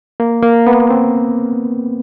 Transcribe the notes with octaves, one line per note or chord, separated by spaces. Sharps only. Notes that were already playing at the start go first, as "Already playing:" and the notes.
A#3
A#3
B3
C4